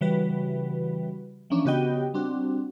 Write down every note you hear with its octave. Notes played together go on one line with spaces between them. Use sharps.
C#3 E3 G3 F#4 B4
E3 F3 A#3 C#4 D4
C#3 B3 F#4 G4 D#5 G5
G3 C4 D4 F#4